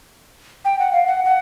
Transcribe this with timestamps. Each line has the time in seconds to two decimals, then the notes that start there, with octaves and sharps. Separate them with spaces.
0.65 G5
0.79 F#5
0.93 F5
1.07 F#5
1.25 F#5